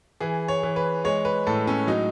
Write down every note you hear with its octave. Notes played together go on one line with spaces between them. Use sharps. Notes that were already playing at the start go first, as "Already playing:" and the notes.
E3 G#4
C#5
E3
B4
G#3 C#5
B4
A2 A4
C#4
F#3 D#4